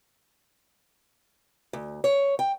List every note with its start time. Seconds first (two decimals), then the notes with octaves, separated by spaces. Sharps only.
1.73 D2
2.04 C#5
2.39 G5